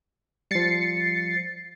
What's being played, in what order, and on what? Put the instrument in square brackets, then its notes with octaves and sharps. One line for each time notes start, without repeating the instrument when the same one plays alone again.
[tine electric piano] F3 G3 [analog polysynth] A6 C7 C#7